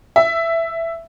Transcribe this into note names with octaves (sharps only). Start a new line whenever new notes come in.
E5